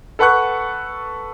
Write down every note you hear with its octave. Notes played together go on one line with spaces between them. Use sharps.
A4 B4 F#5 C#6 F#6